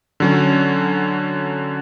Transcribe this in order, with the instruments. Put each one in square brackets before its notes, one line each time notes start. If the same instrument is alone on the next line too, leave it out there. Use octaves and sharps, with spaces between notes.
[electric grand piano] D3 F#3 C#4